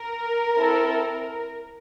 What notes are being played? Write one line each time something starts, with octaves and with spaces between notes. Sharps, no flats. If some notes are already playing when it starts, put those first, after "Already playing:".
Already playing: A#4
C4 E4 A4